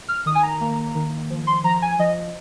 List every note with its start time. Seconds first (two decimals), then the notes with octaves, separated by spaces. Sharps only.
0.08 F6
0.26 D#3 D#6
0.35 G#5
0.43 A#5
0.61 A#3
0.95 D#3
1.30 F3
1.47 C6
1.64 F3 A#5
1.82 G#5
1.99 F3 D#5